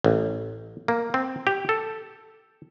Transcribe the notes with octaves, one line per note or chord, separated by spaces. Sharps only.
A1
A#3
C4
G4
A4